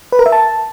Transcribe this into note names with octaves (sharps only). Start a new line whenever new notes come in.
B4
A#4
E5
A5